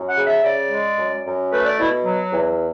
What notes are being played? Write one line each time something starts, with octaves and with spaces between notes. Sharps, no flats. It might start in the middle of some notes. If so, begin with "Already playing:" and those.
Already playing: F#2
F#5
C#3
E5
C#3 D5
G#3
F#2
F#2
A3 B4
D5
B2 E4
F#3
E2